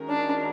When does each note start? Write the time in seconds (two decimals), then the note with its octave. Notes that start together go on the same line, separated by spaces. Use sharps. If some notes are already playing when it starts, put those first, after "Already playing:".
Already playing: D#3 G#3 C#4 F#4 A#4
0.10 D4